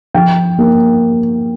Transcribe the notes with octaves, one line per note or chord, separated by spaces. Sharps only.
F3 G5
A#3